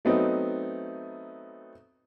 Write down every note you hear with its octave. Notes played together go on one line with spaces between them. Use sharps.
F#3 A3 B3 C4 D#4